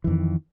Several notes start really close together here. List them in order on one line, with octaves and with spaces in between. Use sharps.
E3 F2 D#3